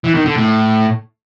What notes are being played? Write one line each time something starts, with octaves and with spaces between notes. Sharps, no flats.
E3
D#3
D3
A2